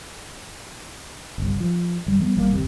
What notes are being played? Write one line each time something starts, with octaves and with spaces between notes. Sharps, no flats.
G1 C2
F3
G1 G3
E3 G3 A3 B3
G#1 G3 A#3
G1 D#2 C3